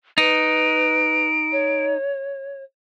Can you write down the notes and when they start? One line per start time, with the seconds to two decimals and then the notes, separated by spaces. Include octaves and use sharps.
0.18 D#4 B4 D7
1.52 C#5